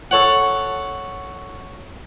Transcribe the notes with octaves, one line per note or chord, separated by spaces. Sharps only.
A4 C#5 F#5